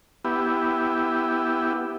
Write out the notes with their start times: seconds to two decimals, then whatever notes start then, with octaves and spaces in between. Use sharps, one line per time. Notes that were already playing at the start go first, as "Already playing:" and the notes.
0.25 B3 E4 G4